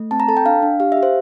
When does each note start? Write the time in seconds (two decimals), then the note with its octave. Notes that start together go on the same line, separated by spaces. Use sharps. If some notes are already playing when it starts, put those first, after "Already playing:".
Already playing: A3
0.11 C4 A5
0.20 A#5
0.28 A4 A5
0.37 G5
0.46 D4 F5
0.63 D4
0.80 G4 F5
0.92 E5
0.97 G4
1.03 C5